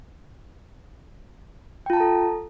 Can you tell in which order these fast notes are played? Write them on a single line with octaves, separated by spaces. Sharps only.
G5 F4 A5 A#5 A4